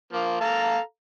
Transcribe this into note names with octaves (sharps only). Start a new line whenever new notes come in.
F3 A#3
A4 F5 A#5